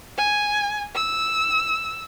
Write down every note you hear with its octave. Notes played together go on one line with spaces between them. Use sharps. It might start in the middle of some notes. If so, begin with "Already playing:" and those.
G#5
E6